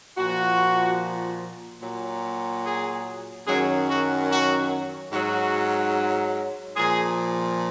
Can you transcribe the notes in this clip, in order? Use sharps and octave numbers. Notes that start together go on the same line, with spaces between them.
A#2 F3 F#4
A#2 F#3
G#4
F#2 D#3 F#3 G#4
F#4
F#4
G#2 F#3 F#4
A#2 F3 G#4